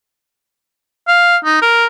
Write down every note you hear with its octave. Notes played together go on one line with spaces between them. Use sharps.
F5
D#4
A#4